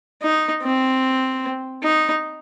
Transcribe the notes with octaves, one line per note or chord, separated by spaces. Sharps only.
D#4
C4
D#4